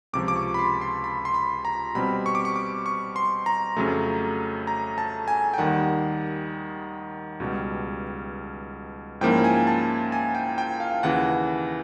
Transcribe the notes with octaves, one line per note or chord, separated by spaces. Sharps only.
C#2 C3 F3 D6
D6
C#6
B5
C6
C6
B5
C6
B5
A#5
B2 G3 C4 B5
C#6
D6
C#6
D6
C#6
C6
A#5
F2 C#3 F#3 A3
A#5
A5
G#5
G5
D#2 D#3 G3 F#5
C#2 B2 G3
G#2 F3 A#3 C#4 E4 G5
G#5
A5
G#5
G5
G5
F5
D#2 C#3 E3 F#5